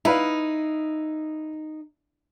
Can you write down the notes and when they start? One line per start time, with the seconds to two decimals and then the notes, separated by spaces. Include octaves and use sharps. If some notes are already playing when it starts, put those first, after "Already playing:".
0.05 D#4 E4 B4 F5